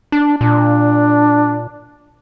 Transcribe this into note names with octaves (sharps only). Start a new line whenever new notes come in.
D4
A#2 D4